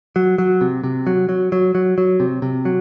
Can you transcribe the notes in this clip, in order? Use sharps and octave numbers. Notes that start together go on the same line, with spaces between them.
F#3
F#3
C3
C3
F#3
F#3
F#3
F#3
F#3
C3
C3
F#3